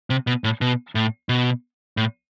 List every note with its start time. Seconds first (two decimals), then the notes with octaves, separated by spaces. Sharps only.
0.10 C3
0.27 B2
0.44 A2
0.61 B2
0.95 A2
1.29 B2
1.97 A2